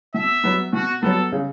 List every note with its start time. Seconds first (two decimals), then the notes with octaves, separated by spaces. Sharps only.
0.14 B2 E5
0.44 F#3 B3
0.73 B2 F#4
1.02 F#3 B3 A4
1.32 C#3